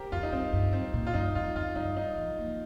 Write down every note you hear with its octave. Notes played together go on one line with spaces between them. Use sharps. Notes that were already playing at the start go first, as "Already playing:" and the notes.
Already playing: G4 A#4 C5
F2 F4
D#4
G2 C4
G2
C4
A#2
F4
G2 D#4
F2 F4
F2 F4
G2 D#4
D#4
F3
A#3